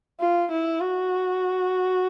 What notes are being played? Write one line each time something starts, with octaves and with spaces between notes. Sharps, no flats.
F4
E4
F#4